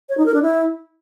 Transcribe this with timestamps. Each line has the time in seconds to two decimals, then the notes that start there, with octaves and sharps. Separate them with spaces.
0.09 C#5
0.18 D#4
0.26 A#4
0.34 D4
0.43 E4